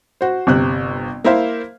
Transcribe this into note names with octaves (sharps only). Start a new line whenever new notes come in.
F#4 C5
G1 C3 F#6
A#3 E4 A#4 C5 E5 F5